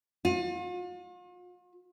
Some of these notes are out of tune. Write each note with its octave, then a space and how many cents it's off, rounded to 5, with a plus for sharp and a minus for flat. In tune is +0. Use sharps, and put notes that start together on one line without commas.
F4 +45